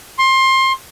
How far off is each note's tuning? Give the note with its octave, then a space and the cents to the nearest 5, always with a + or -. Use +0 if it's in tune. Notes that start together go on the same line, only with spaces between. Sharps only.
C6 +25